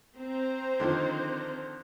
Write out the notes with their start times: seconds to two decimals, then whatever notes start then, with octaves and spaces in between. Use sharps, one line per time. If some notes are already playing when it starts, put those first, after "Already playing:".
0.16 C4 C5 A#5
0.80 D3 D#3 F3